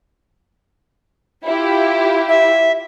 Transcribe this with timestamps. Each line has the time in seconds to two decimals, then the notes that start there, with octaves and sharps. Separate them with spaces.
1.46 E4 F4 G4
2.29 E5